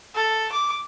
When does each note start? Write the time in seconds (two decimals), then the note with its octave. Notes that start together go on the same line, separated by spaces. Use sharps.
0.15 A4
0.52 D6